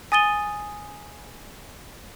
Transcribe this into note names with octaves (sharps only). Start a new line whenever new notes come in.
G#5 D#6 A6 D#7 G7